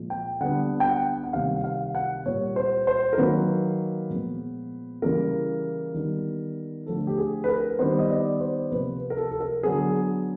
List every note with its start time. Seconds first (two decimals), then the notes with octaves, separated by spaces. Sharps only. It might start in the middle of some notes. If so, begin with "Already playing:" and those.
Already playing: A#2 F3 G#3
0.10 G5
0.41 D3 G3 B3 F#5
0.80 G5
0.87 F#5
1.24 F#5
1.33 C3 D#3 G3 A#3 F5
1.55 F#5
1.64 F5
1.95 F#5
2.26 A#2 G3 A#3 C#5
2.56 C5
2.87 C5
3.13 A#4
3.18 D#3 F#3 A#3 B4
4.10 A#2 F3 G#3 B3
5.02 C#3 E3 G3 A#3 A#4
5.94 D#3 G3 B3
6.86 D3 F3 A3 A4
7.07 G4
7.18 G#4
7.44 B4
7.48 A#4
7.79 D#3 G3 B3 C5
7.99 D#5
8.10 D5
8.40 C5
8.71 C3 F3 A#3 B4
9.10 A#4
9.17 A4
9.31 A4
9.40 A#4
9.63 D3 F#3 B3 G#4